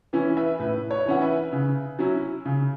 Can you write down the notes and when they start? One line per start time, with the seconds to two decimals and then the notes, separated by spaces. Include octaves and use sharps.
0.13 E3 C#4 E4
0.37 B4 E5
0.59 A2 B4
0.91 C#5
1.06 E3 C#4 E4 F#5
1.21 B4 E5
1.53 C#3
1.99 F#3 C#4 E4
2.45 C#3